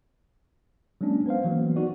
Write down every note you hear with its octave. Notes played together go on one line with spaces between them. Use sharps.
F#3 G#3 A#3 C#4 D4
B3 B4 C5 F5
E3 F#3 A#3 B3
D#4 F#4 D5